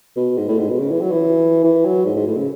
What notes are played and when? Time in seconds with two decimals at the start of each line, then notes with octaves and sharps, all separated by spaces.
0.16 B2
0.37 G#2
0.48 A2
0.59 G#2
0.69 B2
0.79 C#3
0.91 E3
1.01 F#3
1.11 E3
1.64 E3
1.85 F#3
2.06 G#2
2.16 G#2
2.27 A2
2.37 C#3